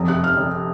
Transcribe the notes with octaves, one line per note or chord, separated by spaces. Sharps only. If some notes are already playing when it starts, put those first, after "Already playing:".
Already playing: F1 F2
C3 F#6
F2 F6
F1